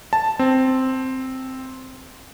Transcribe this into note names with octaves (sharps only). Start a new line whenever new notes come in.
A5
C4